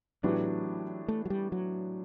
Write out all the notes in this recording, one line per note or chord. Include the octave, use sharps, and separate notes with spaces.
A2 E3 F#3 B3 D4 G4
A3
F#3
G3
F#3